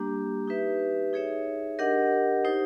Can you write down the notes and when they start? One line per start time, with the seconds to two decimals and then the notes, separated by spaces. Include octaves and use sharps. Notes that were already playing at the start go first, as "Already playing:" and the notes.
Already playing: G3 A#3 D4 G4
0.47 D#4 G4 B4 E5
1.13 D#4 G#4 C#5 E5
1.79 D4 G4 A#4 D#5 F#5
2.45 D#4 G4 C5